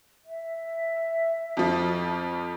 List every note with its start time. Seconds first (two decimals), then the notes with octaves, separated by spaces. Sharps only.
0.25 E5
1.57 F2 F3